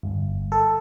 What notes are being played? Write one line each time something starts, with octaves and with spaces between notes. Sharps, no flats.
G1
A4